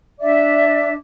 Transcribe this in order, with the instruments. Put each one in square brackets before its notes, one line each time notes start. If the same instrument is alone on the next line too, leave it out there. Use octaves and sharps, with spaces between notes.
[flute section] D4 D5 E5 D6